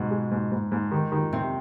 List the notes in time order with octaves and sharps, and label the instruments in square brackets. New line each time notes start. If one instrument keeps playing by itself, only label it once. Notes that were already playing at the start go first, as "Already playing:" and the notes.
Already playing: [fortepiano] G#2 G#3 [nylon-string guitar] B2
[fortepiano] G#3
G#2
G#2
G#2
D#3
D#3
[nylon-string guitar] C3 [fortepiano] C4